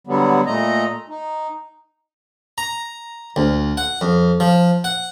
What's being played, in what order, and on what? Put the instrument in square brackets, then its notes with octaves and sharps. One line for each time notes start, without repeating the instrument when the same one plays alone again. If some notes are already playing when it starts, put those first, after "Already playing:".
[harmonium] D3 F#3 G3 B3
A#2 A3 D#5 A#5
D#4
[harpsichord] A#5
D2
F#5
F2
F3
F#5